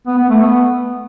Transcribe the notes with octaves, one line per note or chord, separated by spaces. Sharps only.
B3
B3
A3
B3